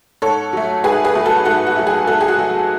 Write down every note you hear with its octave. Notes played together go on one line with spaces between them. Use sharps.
G#2 A4 C#5
F#3 A3
G#2 G#4 B4
G#4 B4
F#3 A3
F#4 A4
G#2 F#4 A4
F#4
F#3 A3
G#4
G#2 F#4 A4
G#4
F#4
F#3 A3